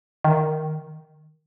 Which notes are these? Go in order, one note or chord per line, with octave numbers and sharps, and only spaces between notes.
D#3